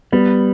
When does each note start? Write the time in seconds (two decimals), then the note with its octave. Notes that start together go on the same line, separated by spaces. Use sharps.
0.12 G3 B3